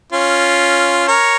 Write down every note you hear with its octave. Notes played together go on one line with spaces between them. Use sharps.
C#4 F4
A#4 C#5